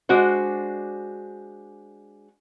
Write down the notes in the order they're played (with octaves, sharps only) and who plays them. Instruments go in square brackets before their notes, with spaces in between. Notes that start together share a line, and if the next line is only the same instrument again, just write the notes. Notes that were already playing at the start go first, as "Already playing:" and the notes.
[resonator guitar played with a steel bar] G#3 D4 F#4 C5